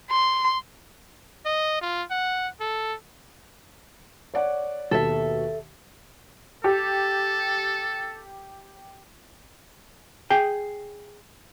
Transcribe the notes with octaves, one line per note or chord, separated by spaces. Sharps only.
C6
D#5
F4
F#5
A4
C#5 D5 F#5
D#2 B2 A4 E5
G4 A4
G#4 G5